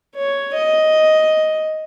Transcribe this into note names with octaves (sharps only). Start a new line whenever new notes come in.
C#5
D#5